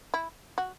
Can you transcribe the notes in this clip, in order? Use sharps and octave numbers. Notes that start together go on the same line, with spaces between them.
E4
F#4